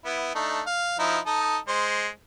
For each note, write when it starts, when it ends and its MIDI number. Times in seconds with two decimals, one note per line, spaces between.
0.05 0.30 59
0.05 0.30 64
0.35 0.61 57
0.35 0.61 62
0.35 0.61 63
0.66 0.97 77
0.99 1.19 53
0.99 1.19 63
0.99 1.19 64
1.26 1.57 63
1.26 1.57 69
1.26 1.57 75
1.68 2.08 56
1.68 2.08 72